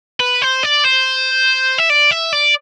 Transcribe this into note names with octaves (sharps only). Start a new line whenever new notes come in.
B4
C5
D5
C5
E5
D5
E5
D5